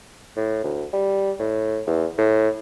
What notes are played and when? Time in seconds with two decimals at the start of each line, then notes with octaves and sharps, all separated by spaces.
0.36 A2
0.64 D2
0.93 G3
1.39 A2
1.87 E2
2.18 A2